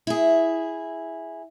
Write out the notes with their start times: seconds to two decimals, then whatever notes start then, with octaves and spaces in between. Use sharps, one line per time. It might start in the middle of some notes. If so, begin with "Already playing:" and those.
0.07 E4 G#4